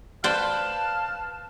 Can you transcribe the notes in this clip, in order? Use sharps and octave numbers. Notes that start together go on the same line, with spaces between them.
B4 C5 D5 F5 G5 A5